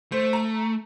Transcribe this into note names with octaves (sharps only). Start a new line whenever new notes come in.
A3 C5
A#5